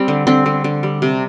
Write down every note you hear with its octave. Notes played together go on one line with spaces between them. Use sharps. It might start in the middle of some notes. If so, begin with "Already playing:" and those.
Already playing: G3 C4
D3
D3 C4
D3
D3
G3
C3